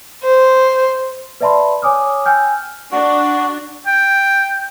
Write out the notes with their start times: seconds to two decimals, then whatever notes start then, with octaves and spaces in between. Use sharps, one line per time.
0.23 C5
1.41 B4 D5 E5 A5 B5 C6
1.82 C#5 G#5 D6 D#6 F6
2.26 G5 G#5 E6 F6 G6
2.92 D4 F#4
3.87 G5